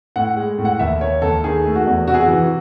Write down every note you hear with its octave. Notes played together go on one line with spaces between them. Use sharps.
A2 F#5
G#3
A2
F#5
D#2 E5
D#2 C#5
D#2 A4
D#3 G#4
A3
F#4
E2
C3 F#4
G#4
F#4
E3